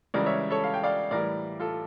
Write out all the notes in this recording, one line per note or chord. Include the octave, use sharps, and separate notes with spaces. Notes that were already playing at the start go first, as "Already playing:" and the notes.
C#2 C#3 E3 G3 A#4 D5
C#5 E5
A4 C#5
F5
G5
D5 F5
A2 E3 G3 A#4 D5
F4 A4